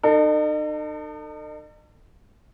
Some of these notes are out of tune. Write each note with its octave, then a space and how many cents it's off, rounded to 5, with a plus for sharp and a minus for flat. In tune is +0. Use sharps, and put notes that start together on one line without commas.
D#4 -40 A4 +35